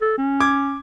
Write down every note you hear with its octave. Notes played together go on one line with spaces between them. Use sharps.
A4
C#4
D6 G#6